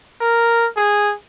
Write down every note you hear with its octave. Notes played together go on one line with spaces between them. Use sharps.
A#4
G#4